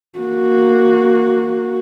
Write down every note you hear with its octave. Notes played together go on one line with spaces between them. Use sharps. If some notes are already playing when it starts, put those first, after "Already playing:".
A#3 F#4